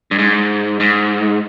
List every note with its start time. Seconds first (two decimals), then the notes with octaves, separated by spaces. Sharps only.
0.11 G2
0.19 G#2
0.80 G#2